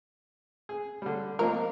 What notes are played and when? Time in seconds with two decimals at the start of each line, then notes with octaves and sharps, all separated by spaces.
0.69 G#4
1.02 D3 G3
1.39 G#1 F3 A#3 A#4